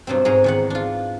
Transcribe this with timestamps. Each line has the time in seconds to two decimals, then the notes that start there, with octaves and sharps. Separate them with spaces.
0.07 G2 B2 F#3 C4
0.25 G#2 F#3 G#4 A#5
0.44 E2 D#3 F#5
0.70 D4 F4